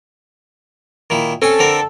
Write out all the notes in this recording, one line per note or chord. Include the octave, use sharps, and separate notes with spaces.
A#2 D#3 E4
C4 C#4 A4 G#5
D3 C4 A#4